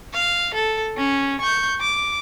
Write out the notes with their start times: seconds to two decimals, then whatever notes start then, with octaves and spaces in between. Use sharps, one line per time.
0.13 F5
0.54 A4
0.97 C#4
1.40 C#6 G6
1.80 D6